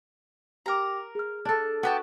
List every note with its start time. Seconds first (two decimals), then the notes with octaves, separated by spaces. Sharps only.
0.66 G4 A#4 G5 A#5 D6
1.15 G#4 F6
1.45 D4 A4
1.83 B3 F#4 G4 A5